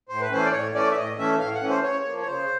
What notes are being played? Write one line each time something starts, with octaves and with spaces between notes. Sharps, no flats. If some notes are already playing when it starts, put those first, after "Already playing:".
A2 C5
B4
E3 A3 C#4 C5
D5
A2 C#5
E3 A3 C#4 D5
E5
A2 D#5
E3 A3 C#4 E5
A2 F5
F#5
E3 A3 C#4
C5
C#3 C#5
F3 A#3
C#5
C#3 C5